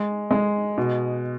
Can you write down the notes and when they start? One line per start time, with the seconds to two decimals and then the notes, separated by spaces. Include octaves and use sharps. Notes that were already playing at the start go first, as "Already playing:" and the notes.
Already playing: G#3
0.31 G#3
0.78 B2